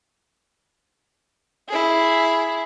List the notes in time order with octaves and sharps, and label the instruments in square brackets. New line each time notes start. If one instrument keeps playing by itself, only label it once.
[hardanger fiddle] E4 G#4